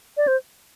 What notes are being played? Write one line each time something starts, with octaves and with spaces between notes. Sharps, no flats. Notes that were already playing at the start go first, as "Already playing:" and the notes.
D5
C5